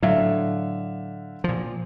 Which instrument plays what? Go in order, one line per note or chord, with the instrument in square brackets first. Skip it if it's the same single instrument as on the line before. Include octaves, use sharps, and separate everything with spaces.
[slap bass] A2 F#3 [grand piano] D3 E5 F5
[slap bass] A#2 F3